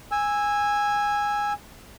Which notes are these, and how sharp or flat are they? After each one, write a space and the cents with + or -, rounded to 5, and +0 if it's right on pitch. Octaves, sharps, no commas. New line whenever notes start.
G#5 -10 E6 +0